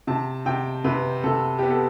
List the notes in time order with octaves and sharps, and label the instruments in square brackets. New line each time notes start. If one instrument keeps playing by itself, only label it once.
[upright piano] C3 A5
C3 G5
C3 B4
C3 A4
B3 G4
A4